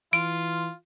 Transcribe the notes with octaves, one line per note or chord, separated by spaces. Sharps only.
E3 F4 D7